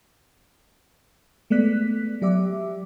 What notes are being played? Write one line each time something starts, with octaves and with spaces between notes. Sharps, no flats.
G#3 A3 B3 D5 F#6 B6
F#3 G4 D5 E5 D6